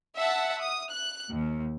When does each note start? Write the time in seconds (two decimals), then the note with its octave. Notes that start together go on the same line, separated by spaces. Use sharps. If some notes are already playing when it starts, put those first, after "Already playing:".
0.17 E5 F#5 A5
0.60 D#6
0.91 F#6
1.30 D#2